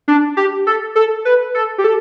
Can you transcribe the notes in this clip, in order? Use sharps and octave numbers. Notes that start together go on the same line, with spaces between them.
D4
G4
A4
A4
B4
A4
G4
A4